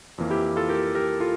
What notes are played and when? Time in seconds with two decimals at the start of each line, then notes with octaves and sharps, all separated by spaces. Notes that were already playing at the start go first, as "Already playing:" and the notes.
0.18 F2 E3 A#3
0.30 E4 G4
0.56 F4 A4
0.69 G4 A#4
0.95 G4 A#4
1.20 F4 A4